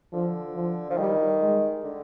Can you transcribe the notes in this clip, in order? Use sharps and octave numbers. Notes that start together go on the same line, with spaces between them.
D3 F3
F3
F3
D#3 G3
G#3
D3